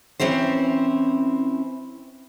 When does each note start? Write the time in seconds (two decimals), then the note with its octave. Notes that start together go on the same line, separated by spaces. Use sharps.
0.20 E3 C4 C#4 E4 C5